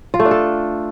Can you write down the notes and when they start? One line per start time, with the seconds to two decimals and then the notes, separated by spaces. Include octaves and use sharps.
0.14 F4
0.20 A3
0.25 D4
0.31 A4